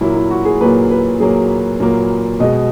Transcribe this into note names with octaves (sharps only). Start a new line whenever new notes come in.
A#2 F#3 A#3 E4
E4
F#4
G#4
A#2 F#3 A#3 B4
B4
A#2 F#3 A#3 G#4
A#2 F#3 A#3
B2 G#3 D#5